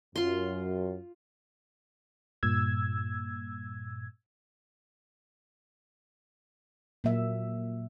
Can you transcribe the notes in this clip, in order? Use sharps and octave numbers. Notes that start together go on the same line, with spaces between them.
F#2 F4 C6
G2 A#2 E6 G#6
A#2 F#3 A#3 E5